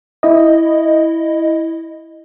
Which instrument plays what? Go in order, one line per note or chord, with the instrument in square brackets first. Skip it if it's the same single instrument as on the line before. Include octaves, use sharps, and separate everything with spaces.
[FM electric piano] E4 D#5